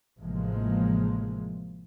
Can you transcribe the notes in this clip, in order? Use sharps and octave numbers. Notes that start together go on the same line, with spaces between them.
A1 C3 F3 G#3 A#3